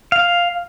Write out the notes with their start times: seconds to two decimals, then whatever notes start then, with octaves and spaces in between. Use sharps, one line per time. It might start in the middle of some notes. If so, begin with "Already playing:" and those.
0.12 F5